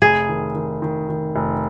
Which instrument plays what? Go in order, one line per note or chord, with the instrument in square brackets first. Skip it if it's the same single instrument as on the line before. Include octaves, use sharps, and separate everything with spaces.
[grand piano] F1 [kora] G#4
[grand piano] D#3
D#3
D#3
D#3
F1